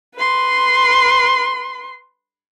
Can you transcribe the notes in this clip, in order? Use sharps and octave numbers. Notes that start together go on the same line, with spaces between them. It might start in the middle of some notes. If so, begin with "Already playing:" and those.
B4 C6